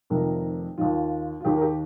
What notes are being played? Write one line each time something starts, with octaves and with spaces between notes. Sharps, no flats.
F1 F2 C3 D#3 A#4
D#2 D#3 F4
F4
D#2 D#3 G4
A#4
G4